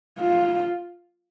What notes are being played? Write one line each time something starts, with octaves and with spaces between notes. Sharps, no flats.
F4